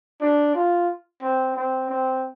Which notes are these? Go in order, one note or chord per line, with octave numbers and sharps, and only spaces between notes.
D4
F4
C4
C4
C4